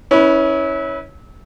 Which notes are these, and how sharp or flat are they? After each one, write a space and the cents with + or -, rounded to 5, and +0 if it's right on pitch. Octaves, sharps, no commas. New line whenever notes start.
C#4 +0 E4 -30 B4 -5